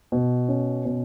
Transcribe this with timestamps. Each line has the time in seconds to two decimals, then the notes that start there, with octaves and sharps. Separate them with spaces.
0.12 B2
0.48 C#4
0.85 B2